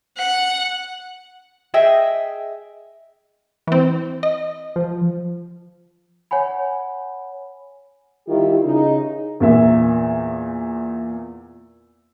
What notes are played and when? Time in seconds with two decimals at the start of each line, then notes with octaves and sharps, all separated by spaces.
0.17 F#5
1.74 G#4 D#5 E5 G5
3.67 E3 C4
4.23 D#5
4.76 F3
6.31 C#5 F#5 G#5 B5
8.27 D#3 G3 E4 F4 G4
8.64 C#3 D#4
9.40 E2 A#2 E5